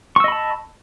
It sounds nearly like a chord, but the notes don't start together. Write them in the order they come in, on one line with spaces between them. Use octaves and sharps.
C#6 E6 D#5 B5 A5